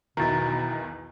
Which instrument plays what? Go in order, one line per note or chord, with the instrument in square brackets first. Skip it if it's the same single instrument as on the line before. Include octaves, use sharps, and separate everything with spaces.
[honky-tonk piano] B1 E2 [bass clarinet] B2 [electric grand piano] D#3 E4 [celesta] A#5 A6